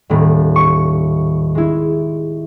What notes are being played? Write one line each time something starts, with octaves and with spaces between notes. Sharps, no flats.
D#1 A2
C#6 C#7
G#3 E4